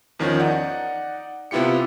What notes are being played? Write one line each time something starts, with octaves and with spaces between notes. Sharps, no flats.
E2 D#3 F3 C#4
D#4 D5 F#5
C3 B3 E4 F4 G4 C#7